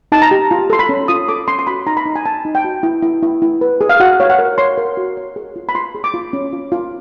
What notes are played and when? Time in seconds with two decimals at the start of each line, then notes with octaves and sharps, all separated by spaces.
0.12 D#4 A5
0.22 A#5
0.31 G4
0.51 F4
0.70 A4 C6
0.79 B5
0.89 C#4
1.08 F4 D#6
1.28 A4 D6
1.48 C#4 C6
1.59 C6
1.67 F#4 B5
1.86 D#4 A#5
1.97 B5
2.06 D#4
2.16 G#5
2.26 D#4 A5
2.45 D#4
2.55 G5
2.64 F#4
2.83 E4
3.02 E4
3.23 E4
3.42 E4
3.61 B4
3.81 G#4
3.89 F5
4.00 F#4 F#5
4.20 C#5 F5
4.30 F#5
4.39 A#4
4.58 C#5 C6
4.78 A#4
4.97 F#4
5.17 C#5
5.36 G#4
5.56 F4
5.69 B5
5.75 F4 C6
5.95 G#4
6.04 D6
6.14 F4
6.33 C#4
6.53 F4
6.72 F4